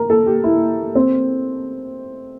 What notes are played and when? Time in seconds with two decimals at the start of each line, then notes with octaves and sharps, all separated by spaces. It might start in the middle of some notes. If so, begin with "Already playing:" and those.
Already playing: A#4
0.10 A4
0.26 G4
0.44 E4
0.95 C4